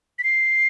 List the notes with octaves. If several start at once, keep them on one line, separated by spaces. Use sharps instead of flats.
B6
C7